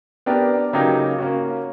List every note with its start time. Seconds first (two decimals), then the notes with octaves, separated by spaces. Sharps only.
0.26 B3 D4 G4 A#4
0.73 C#3 F#3 A#3 D#4 G4
1.18 A#3 C#4 F#4